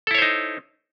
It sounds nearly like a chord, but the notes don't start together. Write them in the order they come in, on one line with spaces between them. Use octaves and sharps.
A4 E4 C#5 C5 D#4